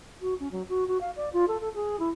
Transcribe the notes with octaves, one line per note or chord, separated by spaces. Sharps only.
F#4
C#4
F#3
F#4
F#4
F5
D5
F4
A4
A4
G#4
E4